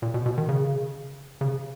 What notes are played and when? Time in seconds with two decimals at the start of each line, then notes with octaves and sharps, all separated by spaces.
0.02 A#2
0.14 B2
0.26 B2
0.38 D#3
0.49 C#3
1.41 C#3